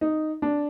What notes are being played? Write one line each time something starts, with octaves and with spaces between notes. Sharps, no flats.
D#4
D4